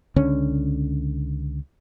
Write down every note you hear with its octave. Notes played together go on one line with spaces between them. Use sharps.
C#2 D3 C#4